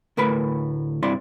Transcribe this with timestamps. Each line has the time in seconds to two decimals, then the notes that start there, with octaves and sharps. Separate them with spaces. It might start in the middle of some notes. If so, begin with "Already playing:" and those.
0.17 D2 A2 A#4 B4 B5
1.03 G2 C3 E4 D5 C6